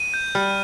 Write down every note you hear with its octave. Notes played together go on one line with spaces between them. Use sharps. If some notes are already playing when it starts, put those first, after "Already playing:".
Already playing: D#7
G6
G3 F6